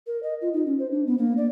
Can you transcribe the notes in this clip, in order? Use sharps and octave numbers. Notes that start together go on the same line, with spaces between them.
A#4
D#5
F4
D#4
C#4
C5
D4
B3
A#3
D5